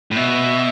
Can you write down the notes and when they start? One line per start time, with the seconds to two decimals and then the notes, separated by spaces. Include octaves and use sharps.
0.11 A2
0.16 B2 E5